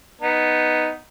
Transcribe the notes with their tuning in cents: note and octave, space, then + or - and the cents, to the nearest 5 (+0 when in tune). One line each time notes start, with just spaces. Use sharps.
B3 +0 D#4 +0